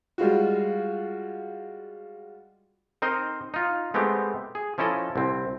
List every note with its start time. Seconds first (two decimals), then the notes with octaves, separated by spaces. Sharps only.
0.18 G3 G#3 F4 F#4
3.02 C4 D#4 A#4 C5 D#5
3.54 D#4 F4
3.94 G#3 A3 B3 C4 G4
4.55 G#4
4.78 F3 C#4 E4 A4 D#5
5.16 C2 C4